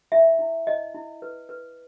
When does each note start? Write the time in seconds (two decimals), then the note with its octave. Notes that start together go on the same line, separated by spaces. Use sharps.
0.12 E4 E5
0.39 E4
0.67 E4 D#5
0.94 E4
1.22 B4
1.49 B4